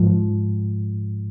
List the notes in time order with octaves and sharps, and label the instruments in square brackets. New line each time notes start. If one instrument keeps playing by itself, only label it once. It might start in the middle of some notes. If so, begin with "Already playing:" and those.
Already playing: [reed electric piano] G#2 F3